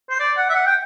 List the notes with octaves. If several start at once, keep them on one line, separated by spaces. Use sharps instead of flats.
C5
D5
F#5
E5
F#5
G5